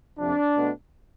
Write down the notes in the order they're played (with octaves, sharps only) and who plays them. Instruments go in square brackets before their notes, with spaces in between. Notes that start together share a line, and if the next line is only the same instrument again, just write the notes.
[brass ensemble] F2 C3 F3 D4
B2 A3